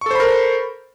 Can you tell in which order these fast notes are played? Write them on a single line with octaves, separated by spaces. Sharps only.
C#6 A4 C5 B5 A#4